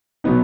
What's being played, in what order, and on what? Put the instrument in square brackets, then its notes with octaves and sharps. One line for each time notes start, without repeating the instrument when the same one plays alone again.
[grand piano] B2 F#3 B3 D#4